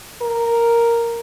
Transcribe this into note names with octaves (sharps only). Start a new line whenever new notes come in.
A#4